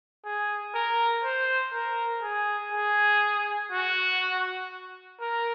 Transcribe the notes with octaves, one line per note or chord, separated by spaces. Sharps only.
G#4
A#4
C5
A#4
G#4
G#4
F#4
A#4